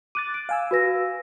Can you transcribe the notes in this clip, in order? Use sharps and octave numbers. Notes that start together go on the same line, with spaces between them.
D6 F#6 A6 D#7
D7
F5 G#5 E6
F#4 B4 A#6